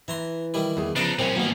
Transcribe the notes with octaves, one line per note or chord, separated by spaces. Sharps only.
E3 E5 A#5 C6
D#3 G3 E4
E2 G#4
C#3 F3 D4 D#4 B4 D#5 F5
F#2 B2 E3 C4 C#4
G2 D#3 A#3 B3 F#4